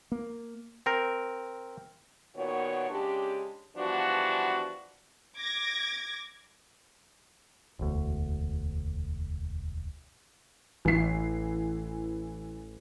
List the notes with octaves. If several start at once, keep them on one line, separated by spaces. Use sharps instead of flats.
A#3
C4 A#4
A#2 D#3 B3 F#4 C#5
C#3 G#3 D4 G4
E3 F3 G3 B3 D4 F#4
D6 G#6 A#6
E1 D2
A1 E3 C7